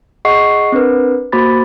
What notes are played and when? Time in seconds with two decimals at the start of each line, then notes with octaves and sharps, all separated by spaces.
0.25 G#4 D#5 F#5 C#6 C7
0.72 C4 D4 A#4 B4
1.32 A#3 F#4 C5 B5 D6 A6